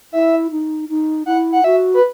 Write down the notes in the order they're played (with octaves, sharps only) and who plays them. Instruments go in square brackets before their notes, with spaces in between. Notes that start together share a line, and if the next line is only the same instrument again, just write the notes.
[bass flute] E4 [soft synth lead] E5
[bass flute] D#4
D#4
[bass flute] E4 [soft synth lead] F#5
[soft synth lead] F#5
[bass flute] F#4 [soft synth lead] E5
[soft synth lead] B4